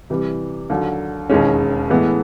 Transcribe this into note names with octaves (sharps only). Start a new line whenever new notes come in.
C3 E3 G3
D#2 D3 F#3
E1 D#2 D#3 G#3 C#4
A2 E3 G#3 B3